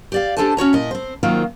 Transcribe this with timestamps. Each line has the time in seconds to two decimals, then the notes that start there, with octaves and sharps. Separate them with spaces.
0.12 G4 D5 F5
0.37 D4 G4 A4 C5 G#5 A5
0.57 C#4 F#4 C#5 A#5
0.73 A#2 E4 D#5
0.91 C4 C5
1.23 D#3 F#3 A#3 C4 F4